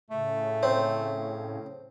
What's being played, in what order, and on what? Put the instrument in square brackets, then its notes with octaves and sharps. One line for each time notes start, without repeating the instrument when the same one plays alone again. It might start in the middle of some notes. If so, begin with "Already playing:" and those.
[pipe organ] A2 C#3 [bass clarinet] A3
[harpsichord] C4 [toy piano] C#5